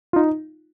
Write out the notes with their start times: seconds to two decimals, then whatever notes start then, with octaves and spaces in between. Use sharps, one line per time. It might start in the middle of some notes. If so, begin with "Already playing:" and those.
0.13 F4
0.16 D#4